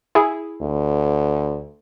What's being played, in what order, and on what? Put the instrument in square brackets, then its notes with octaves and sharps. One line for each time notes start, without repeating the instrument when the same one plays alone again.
[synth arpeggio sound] E4 G#4
[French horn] D2